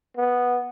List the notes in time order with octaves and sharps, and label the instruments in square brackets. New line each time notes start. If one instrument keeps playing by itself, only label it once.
[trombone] B3